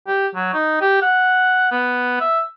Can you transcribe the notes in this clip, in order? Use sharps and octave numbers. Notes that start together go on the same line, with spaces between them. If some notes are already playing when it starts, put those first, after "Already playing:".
G4
F#3
D#4
G4
F#5
B3
E5